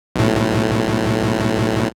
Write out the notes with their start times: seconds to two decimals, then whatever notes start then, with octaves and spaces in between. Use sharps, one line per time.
0.16 B1 A2